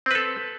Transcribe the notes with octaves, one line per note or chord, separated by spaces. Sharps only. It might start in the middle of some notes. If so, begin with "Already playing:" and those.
C4 A4 B4